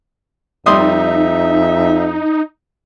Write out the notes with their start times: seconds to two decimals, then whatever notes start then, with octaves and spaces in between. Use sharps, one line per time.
0.66 F2 G3 D#4 E5 C6 D#6